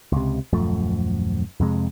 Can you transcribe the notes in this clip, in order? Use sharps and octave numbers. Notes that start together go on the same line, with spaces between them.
C#2 C3
D#1 F#2 F3 A3
F2 C3 G#3